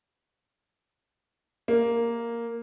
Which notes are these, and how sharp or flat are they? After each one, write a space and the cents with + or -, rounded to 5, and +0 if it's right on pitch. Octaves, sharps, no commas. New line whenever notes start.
A#3 +0